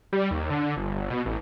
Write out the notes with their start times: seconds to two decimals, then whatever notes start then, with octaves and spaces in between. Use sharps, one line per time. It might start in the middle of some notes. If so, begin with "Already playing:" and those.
0.13 G3
0.31 D#2
0.50 D3
0.63 D3
0.77 G1
0.95 G1
1.10 B2
1.25 A1